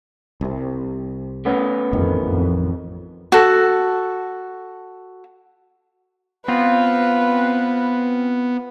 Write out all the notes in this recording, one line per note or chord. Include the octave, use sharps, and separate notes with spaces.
C2 C3
A3 B3 C#4
A1 F2 A2 D#3
F2
F#4 A4
B3 C4 F4 B4